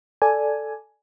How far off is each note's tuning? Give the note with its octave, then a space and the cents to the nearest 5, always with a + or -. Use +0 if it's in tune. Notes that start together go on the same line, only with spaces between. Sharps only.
A4 +0 D5 +0 G#5 +5